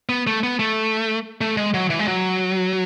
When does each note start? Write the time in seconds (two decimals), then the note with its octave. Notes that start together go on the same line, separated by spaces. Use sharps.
0.09 B3
0.27 A3
0.43 B3
0.59 A3
1.41 A3
1.57 G#3
1.74 F#3
1.90 E3
1.99 G#3
2.08 F#3